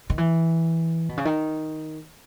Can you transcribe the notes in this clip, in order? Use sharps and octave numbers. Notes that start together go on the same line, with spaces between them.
D#3
E3
B2
C#3
D#3